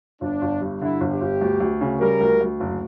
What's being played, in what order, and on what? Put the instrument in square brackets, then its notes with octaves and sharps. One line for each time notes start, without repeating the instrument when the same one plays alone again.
[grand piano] G1 [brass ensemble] D4
[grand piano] G1
G2
[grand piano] D3 [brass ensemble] E4
[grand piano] G1
[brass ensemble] G4
[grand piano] G1
D2
D2
C#3
[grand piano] G3 [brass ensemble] A#4
[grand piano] D2
D2
F#1